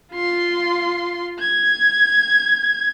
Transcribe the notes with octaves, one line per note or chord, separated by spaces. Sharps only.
F4 C6
G#6